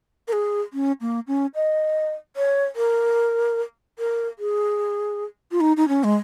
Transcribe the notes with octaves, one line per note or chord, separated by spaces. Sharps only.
A#4
G#4
C#4
A#3
C#4
D#5
C#5
A#4
A#4
G#4
F4
D#4
D#4
C#4
G#3